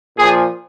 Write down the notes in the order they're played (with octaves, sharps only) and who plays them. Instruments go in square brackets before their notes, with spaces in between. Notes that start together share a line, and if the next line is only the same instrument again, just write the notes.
[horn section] A#2 F3 G#4